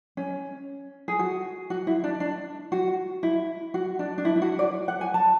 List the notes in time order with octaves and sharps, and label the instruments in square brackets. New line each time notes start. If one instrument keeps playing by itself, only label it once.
[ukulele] C#4
G#4
F#4
F#4
E4
D4
D4
F#4
E4
F#4
D4
D4
E4
E4
F#4
D5
F#5
G#5
A5